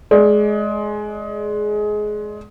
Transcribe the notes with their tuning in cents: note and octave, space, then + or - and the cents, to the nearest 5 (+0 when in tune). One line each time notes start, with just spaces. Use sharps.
G#3 +20 D5 +0